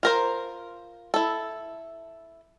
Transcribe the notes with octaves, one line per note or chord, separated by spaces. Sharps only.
F4 A#4 C5
E4 A4